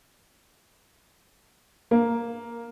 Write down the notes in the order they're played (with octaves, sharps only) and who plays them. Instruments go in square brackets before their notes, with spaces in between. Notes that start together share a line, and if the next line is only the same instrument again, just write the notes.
[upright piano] A#3